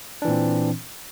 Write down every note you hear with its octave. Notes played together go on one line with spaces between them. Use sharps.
A#2 E3 C4 D4